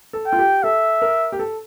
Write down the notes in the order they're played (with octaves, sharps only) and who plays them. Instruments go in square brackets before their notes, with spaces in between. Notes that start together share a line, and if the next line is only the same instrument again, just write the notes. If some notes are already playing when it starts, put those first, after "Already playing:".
[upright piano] A4
[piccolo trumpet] G5
[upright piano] F4
G4
[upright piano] A4 [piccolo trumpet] E5
[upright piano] A#4
G4
A4